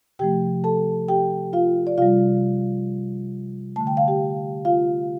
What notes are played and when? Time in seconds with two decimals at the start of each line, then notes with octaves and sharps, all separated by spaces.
0.19 C3 F3 A3 G4 G5
0.64 A4 A5
1.08 G4 G5
1.53 F4 F5
1.87 D5
1.98 C3 G3 F4 F5
3.76 D3 A3 A5
3.87 G5
3.97 F5
4.08 G4 G5
4.65 F4 F5